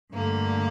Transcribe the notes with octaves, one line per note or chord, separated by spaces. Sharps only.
G2 D3 A3 A#3